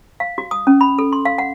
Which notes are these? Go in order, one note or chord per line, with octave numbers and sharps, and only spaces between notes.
F5
F#4
D#6
C#4
B5
A4
C6
F5
F#5